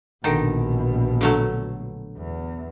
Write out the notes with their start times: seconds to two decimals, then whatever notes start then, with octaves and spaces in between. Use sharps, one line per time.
0.24 A#1 B2 D3 D#3 D#4
1.21 D3 F#3 A3
2.18 E2